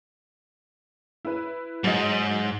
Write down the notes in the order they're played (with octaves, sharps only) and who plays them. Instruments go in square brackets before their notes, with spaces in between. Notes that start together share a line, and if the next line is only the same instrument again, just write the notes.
[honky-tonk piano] E4 B4
[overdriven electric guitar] G#2 [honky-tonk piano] F#3 D#5